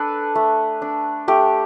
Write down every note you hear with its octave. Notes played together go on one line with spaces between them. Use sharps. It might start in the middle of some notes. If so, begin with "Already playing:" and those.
Already playing: D4 A4 B4
A3
D4
A3 G4